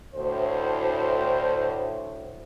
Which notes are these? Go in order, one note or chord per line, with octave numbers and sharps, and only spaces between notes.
D2 A2 C5